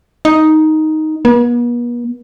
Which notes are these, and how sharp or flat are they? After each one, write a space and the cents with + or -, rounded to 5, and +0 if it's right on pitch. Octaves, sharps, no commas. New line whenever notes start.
D#4 +5
B3 -45